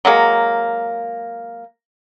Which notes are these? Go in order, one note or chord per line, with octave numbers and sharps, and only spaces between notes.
F#3 G#3 A#3